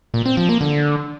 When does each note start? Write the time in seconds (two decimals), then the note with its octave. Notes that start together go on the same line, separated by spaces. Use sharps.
0.14 A#2
0.25 C4
0.37 F3
0.49 A#3
0.61 D3